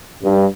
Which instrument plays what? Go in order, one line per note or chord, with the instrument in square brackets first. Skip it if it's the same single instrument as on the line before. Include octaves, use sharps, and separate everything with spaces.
[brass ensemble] G2